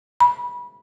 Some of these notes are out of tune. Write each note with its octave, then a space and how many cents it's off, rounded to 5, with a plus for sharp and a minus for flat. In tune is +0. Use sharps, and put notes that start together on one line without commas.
B5 -25